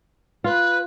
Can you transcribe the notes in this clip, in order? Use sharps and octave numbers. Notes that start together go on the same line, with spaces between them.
F4 B4